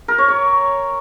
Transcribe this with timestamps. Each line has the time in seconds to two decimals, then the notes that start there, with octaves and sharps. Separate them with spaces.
0.08 A#4
0.18 C#5
0.28 C#5